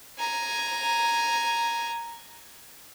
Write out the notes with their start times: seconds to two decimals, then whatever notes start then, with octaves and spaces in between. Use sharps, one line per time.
0.19 G#5 A#5